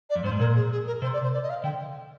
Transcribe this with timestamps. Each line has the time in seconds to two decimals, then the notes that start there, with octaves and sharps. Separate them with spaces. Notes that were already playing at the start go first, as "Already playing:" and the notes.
0.09 D5
0.16 F2
0.24 G2 C5
0.32 G#2
0.39 A#2 A#4
0.55 G#4
0.71 G#4
0.86 A#4
1.02 C3 C5
1.13 D5
1.23 C5
1.33 D5
1.43 D#5
1.49 F5
1.63 D3 G5